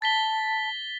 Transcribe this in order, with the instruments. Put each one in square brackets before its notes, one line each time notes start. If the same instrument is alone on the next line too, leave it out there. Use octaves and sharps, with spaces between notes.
[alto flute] A5 [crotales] A6 B6 G7